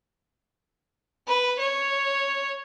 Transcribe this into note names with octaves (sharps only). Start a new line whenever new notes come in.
B4
C#5